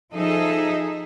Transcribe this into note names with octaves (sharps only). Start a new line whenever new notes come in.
F3 D#4 G#4 A4 D#5 E5